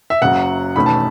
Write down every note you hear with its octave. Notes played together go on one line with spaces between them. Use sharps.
E5
F#1 F#2 C#3 F#3 F#5
E1 E2 D#3 A3 C#4 B5
A5